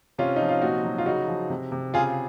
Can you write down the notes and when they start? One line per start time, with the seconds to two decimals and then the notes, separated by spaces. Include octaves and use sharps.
0.18 C3 C#4 F4
0.36 F3 D#4
0.49 F4
0.62 A#2 D#4 F#4
0.84 F#3
0.98 F4
1.06 C#3 D#4 F#4
1.28 F3
1.49 C3
1.72 C3
1.94 C#3 F4 G#4